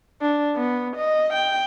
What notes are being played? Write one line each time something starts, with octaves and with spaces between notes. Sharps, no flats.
D4
B3
D#5
G5